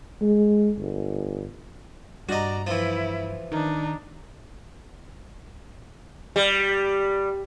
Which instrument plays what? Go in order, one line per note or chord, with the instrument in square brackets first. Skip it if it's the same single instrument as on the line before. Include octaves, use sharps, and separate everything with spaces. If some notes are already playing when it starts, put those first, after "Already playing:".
[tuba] G#3
G1
[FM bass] G2 [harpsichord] F#4 D#5 [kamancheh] D5 A#5
[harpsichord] E3 F3 [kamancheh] E4
[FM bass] D#3 [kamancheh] D4 D#4
[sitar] G3